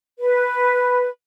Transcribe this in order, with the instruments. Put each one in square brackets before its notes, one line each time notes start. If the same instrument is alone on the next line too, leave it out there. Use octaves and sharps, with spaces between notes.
[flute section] B4